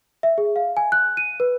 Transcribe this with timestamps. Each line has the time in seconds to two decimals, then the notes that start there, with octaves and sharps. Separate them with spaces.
0.23 E5
0.38 G#4
0.56 F5
0.77 G#5
0.92 F#6
1.17 D#7
1.40 B4